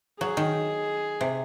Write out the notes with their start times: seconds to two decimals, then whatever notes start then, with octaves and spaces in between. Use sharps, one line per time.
0.20 F#3 G#4
0.37 D#3
1.21 C3